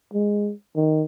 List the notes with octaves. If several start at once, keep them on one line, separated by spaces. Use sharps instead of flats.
G#3
D#3